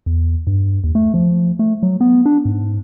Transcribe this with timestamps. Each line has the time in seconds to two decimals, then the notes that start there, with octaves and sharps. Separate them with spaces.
0.06 E2
0.47 G2
0.84 D#2
0.95 A3
1.14 F3
1.59 A3
1.83 F#3
2.01 B3
2.26 D4
2.45 G#2